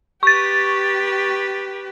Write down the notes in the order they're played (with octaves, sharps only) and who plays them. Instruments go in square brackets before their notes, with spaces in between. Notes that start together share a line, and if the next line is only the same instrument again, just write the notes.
[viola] G4 B4 [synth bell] C#6 A6